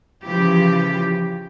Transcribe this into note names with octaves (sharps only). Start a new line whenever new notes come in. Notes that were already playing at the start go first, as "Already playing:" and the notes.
C#3 E3 F3 G4